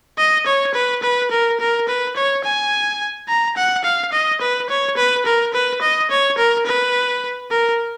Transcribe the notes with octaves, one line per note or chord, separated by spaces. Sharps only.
D#5
C#5
B4
B4
A#4
A#4
B4
C#5
G#5
A#5
F#5
F5
D#5
B4
C#5
B4
A#4
B4
D#5
C#5
A#4
B4
A#4